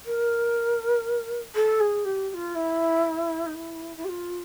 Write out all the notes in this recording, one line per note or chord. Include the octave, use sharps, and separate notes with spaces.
A#4
A4
G#4
G4
G4
F4
E4
D#4
E4
E4
G4
F4